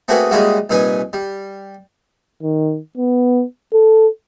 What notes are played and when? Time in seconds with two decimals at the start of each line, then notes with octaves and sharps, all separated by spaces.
0.08 A3 A#3 C4 F#4 G#4 B4
0.31 C#3 G3 G#3 A#3 E4 F#4
0.70 C2 A#2 D#4 B4 G#5
1.13 G3
2.43 D#3
2.98 B3
3.73 A4